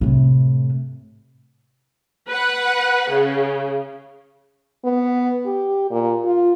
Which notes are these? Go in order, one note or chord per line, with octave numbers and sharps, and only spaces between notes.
A2 C3
B4 F#5
C#3
B3
G4
A#2
F4